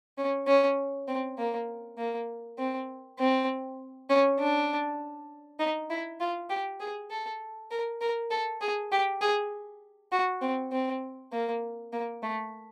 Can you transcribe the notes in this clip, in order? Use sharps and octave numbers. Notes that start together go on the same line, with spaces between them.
C#4
C#4
C4
A#3
A#3
C4
C4
C#4
D4
D#4
E4
F4
G4
G#4
A4
A#4
A#4
A4
G#4
G4
G#4
F#4
C4
C4
A#3
A#3
A3